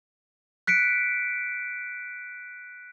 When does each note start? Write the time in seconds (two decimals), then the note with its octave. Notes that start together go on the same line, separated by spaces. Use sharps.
0.67 F#6 B6 C#7 D7